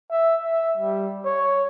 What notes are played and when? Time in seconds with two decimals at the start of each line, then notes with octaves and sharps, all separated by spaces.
0.11 E5
0.44 E5
0.77 G3
1.25 C#5